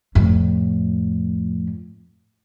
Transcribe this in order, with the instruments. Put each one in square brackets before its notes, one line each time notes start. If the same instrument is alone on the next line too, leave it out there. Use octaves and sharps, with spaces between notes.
[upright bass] F2 A2